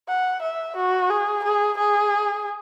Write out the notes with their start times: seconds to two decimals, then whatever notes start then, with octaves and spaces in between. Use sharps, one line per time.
0.08 F#5
0.42 E5
0.76 F#4
1.10 G#4
1.44 G#4
1.77 G#4